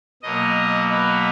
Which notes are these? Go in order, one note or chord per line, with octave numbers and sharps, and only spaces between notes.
B2 F#3 A#3 D#5
B4